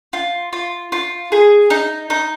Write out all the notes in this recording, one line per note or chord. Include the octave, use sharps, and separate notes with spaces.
F4
F4
F4
G#4
D#4
D#4